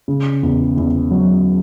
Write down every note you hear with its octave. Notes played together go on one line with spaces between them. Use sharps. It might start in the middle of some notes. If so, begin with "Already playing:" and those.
C#3
E2
E2
F#3